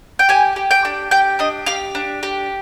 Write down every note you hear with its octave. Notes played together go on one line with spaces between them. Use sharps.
G5
G4 G#5
G4
G5
D4
G4 G5
D4 D#5
G4 F5
D4
G4